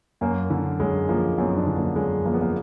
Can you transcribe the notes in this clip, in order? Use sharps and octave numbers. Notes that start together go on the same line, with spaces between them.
F#2 A#3
D3
F#2 G#3
F3 A#3
F#2 B3
D4
D3
A#3
F#2 G#3
F3 A#3
B3
A#3